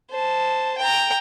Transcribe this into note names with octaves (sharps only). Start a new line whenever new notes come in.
C5 A5
G5 A#5